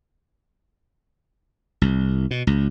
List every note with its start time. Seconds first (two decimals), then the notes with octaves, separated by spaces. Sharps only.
1.82 C2
2.31 B2
2.47 C#2